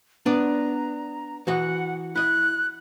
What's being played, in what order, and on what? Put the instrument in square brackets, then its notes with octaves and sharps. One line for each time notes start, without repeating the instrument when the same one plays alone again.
[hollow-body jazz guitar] B3 D4 D5 [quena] A#5
[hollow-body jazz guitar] E3 F#4 D#5 [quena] F#5
[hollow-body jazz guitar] E4 D#5 [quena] F#6